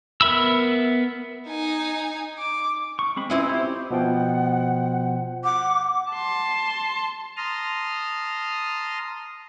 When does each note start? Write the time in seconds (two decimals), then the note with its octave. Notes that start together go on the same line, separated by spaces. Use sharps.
0.21 B3 A#4 E5 B5 E6
1.49 D#4 G#5
2.39 D6
2.99 C#6
3.16 G#3 C4 B5
3.30 C4 C#4 E4 F4 B4 D#5
3.49 G4 C5
3.91 B2 F3 F#5 G5
5.44 F#5 D6
6.11 A5 C6
7.37 A5 A#5 C6 D#6 F6